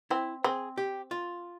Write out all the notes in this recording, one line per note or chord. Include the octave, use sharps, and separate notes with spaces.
C4 E4
C4 G#4
G4
F4